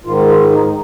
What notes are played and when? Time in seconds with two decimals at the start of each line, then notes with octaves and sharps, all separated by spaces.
0.04 G#2 D#3 F4
0.28 F4
0.52 D#4